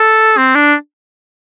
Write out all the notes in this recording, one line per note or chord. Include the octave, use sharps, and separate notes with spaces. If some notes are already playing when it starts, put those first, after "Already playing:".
Already playing: A4
C4
D4